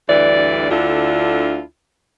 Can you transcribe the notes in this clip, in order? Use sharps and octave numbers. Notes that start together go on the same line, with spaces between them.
D2 G2 E3 D5
D2 D3 D4 E4 F4